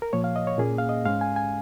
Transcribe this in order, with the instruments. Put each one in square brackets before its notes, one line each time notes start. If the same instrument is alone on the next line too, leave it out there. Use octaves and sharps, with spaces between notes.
[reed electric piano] A#4
A#2 F3 A#3 C#5
F5
D#5
C#5
A#2 A#3 C#4 G#4
F5
D#5
G#2 G#3 C#4 F5
G#5
G#5